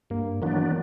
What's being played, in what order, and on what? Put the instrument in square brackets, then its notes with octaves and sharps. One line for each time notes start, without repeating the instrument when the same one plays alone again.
[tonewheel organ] G2 [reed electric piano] A#3
[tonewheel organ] D#3 F#3 B3 D4 [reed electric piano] E3